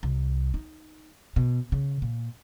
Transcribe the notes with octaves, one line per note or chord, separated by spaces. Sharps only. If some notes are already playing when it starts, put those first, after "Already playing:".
C2
D#4
B2
C#3
A#2